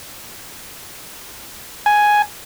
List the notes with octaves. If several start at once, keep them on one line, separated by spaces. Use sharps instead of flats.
G#5